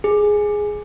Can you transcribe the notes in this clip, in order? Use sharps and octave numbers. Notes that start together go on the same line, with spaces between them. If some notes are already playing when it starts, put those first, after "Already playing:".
G#4